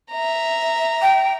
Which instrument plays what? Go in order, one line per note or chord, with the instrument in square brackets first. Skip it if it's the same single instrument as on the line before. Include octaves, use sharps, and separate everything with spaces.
[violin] E5 A#5
[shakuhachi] G5